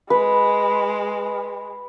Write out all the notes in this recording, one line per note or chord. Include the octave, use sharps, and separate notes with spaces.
G#3 B4